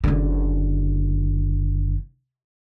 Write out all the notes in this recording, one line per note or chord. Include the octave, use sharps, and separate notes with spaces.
F#1 D3